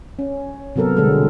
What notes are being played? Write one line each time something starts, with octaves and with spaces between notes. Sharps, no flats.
C#4
C3 F#3 B3 A4 A#4
B2 D3 G3 G#3 A4